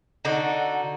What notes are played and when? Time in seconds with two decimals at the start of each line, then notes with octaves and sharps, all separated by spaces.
0.25 D3 D#4 F#4